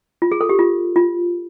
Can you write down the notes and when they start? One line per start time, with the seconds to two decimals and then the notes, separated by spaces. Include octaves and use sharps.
0.22 F4
0.31 G#4
0.41 A4
0.49 G4
0.59 F4
0.96 F4